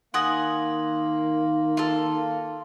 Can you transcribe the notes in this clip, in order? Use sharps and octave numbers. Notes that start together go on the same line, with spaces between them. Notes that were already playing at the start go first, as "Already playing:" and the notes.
D#3 A#3 F#5 G#5 C6 D#6 A#6 F#7
F4 A4